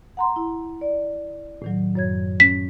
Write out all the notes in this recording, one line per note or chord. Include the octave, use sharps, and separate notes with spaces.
F#5 A#5 C6
E4
D5
A2 D#3 F#3
F#2 C#5 G#6
C#4 B6